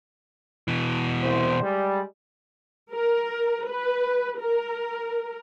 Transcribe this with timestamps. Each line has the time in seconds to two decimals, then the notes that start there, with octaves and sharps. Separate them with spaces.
0.68 B2 E3
1.23 C2 C5
1.63 G3 G#3
2.93 A#4
3.67 B4
4.39 A#4